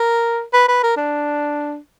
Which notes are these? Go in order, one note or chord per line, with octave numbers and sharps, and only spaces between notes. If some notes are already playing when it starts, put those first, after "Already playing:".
Already playing: A#4
B4
B4
A#4
D4